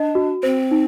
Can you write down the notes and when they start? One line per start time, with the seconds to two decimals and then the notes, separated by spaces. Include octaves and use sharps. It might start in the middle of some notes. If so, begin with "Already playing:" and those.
Already playing: D4 D#5
0.15 F#4
0.43 C4 C5
0.71 D#4